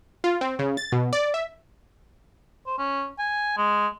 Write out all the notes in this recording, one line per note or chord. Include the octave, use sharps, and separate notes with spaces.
F4
C4
C#3
A6
B2
D5
E5
C5
C#4
G#5
G#3